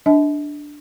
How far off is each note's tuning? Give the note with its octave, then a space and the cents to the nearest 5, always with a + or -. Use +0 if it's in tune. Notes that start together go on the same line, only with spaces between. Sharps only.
D4 +0 D#5 +45 A5 -35